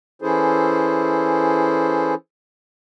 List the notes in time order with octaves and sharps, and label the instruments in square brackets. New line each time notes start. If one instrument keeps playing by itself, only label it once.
[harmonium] E3 C#4 E4 G#4 A4 C5